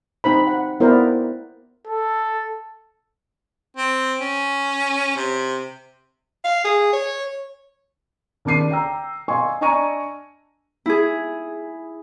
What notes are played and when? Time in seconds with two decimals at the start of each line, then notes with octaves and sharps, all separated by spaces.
0.24 C4 D#4 C5 B5
0.47 F#5
0.80 B3 E4 A#4 C5 D5
1.87 A4
3.76 C4
4.21 C#4
5.16 C3
6.44 F5
6.64 G#4
6.93 C#5
8.45 D#2 C#3 D4 D6 C7 D#7
8.71 G5 A#5 E6
9.28 D#5 F5 G#5 C6 C#6
9.61 D4 D#5 G#5 A#5 C#6 D#7
10.86 E4 G#4